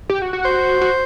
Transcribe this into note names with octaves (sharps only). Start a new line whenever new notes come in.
G4
F#4
F#4
C5
F#4